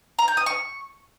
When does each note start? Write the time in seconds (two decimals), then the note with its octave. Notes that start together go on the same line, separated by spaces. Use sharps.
0.19 A#5
0.28 G6
0.37 D#6
0.46 C#6